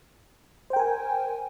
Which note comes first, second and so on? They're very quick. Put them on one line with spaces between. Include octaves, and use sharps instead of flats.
C5 G5 A#4 G#5